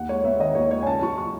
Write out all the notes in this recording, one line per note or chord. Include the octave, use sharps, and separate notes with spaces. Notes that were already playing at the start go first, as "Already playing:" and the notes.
Already playing: D#2 F#5
G#3 C#5
B3 E5
D#3 D#5
D#2 C#5
G#3 C#5
G#5
C#2 A5
F#3 C#6
C#6